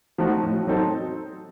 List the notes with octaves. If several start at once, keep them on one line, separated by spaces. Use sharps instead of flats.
F3 A3 D#4 F#4
A2
F#3 C4 D#4 A4